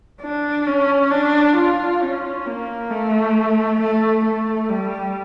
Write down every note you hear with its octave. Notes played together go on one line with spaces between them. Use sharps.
D4
C#4
D4
F4
C#4
A#3
A3
A3
A3
G3